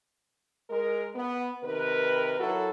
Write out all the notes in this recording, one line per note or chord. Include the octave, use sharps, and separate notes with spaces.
G#3 A#4
B3
C3 D#3 A#4 B4
F#3 E4 F#4 A4 A#4